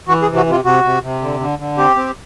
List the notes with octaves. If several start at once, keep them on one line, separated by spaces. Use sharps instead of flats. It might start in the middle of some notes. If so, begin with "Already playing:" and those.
E3 F#4
G#4
C3
F#4
C3 F4
C3 F#4
C3
C3
D3
D3
D3
C4 G4
C4